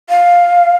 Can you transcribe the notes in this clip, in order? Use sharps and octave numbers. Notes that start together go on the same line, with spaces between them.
F5